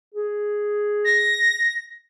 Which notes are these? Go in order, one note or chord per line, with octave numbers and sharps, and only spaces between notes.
G#4
A#6